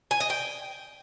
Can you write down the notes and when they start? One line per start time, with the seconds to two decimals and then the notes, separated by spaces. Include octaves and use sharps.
0.11 G#5
0.20 D#5
0.30 G5